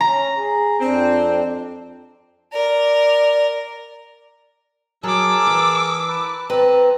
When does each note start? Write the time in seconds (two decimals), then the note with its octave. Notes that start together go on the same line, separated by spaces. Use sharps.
0.01 C#4 A#5
0.37 G#4
0.81 F2 C4 D4
2.53 A#4 D5
5.03 F#3 G#4 A#4 A5 D6 E6
5.47 E3
6.08 B4 A5
6.50 C4 B4 A5 A#5